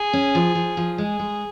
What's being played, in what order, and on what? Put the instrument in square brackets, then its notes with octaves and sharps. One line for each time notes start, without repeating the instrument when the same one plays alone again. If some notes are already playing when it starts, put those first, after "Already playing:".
Already playing: [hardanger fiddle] G#4
[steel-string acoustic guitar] C#4
F3
F3
F3
[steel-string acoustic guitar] G#3 [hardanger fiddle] G#4
[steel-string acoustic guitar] G#3